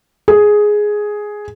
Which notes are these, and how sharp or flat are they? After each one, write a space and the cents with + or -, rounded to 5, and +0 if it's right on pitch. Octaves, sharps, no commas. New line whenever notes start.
G#4 +5